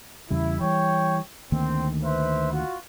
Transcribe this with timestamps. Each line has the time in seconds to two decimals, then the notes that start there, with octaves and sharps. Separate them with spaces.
0.30 E2 C#3 G3 E4
0.60 E3 G3 C#5 G5
1.52 D2 D#3 A#3 C4
2.03 B4 C5 E5
2.52 F4 F#4